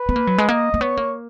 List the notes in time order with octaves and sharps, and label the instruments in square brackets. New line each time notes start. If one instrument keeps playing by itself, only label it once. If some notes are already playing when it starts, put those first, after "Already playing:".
Already playing: [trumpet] B4
[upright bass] B3
A#3
F#3
G#3
[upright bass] A#3 [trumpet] D#5
[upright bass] A#3
[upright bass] B3 [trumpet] C#5
[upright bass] A#3